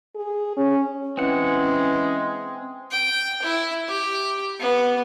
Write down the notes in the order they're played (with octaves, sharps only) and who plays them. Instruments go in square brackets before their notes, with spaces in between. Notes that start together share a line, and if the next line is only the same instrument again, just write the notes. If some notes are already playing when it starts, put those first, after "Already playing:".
[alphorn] G#4
C#4
[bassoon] E3 [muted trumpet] G#3 [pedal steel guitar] C4 F#5 [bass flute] C#4
[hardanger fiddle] G5
E4
G4
B3